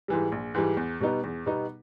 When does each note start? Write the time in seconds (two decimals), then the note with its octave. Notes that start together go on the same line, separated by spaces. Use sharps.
0.08 G#2 E3 G3
0.32 A#1
0.54 G#2 E3 G3
0.77 E2
1.00 B2 G3 B3 D#4
1.24 E2
1.46 B2 G3 B3 D#4